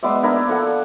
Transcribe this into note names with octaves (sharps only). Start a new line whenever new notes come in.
G#3 B3 D5 E5
D4 E4 A#4
F3 A4 F#5